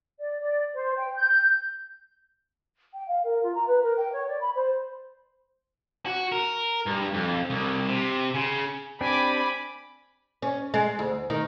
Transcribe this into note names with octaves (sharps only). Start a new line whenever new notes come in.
D5
D5
C5
G5
G6
G5
F5
A#4
F4
A#5
B4
A#4
G5
C#5
D5
B5
C5
F#4
A#4
G2
F2
C2
C3
C#3
C4 D4 G4 G#5 B5 D6
C#4
G#3
D2
D#3